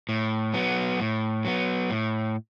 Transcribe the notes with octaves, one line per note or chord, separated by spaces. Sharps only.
A2
F#3 B3
A2
F#3 B3
A2